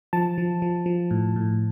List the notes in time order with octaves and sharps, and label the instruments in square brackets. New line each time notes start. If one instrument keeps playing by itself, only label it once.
[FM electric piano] F3 A5
F3
F3
F3
A2
A2